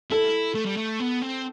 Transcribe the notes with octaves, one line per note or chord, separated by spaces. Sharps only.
E4 A4
A3
G3
A3
B3
C4